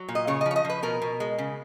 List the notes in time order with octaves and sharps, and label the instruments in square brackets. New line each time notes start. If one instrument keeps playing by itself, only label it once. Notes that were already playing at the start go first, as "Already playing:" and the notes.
Already playing: [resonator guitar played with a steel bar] F#3
A#2
D#5
C#3 C#5
D#5
F3
C#5
D#5
F3
B4
B2 A#4
B2
G#3
C#3